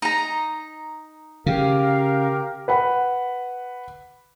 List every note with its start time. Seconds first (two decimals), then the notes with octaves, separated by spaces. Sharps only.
0.02 D#4 A#5
1.46 C#3 G4 A#4 F5
2.68 B4 F#5 B5